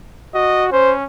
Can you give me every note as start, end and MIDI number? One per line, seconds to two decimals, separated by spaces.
0.34 0.72 66
0.34 0.65 75
0.72 1.04 61
0.72 0.93 72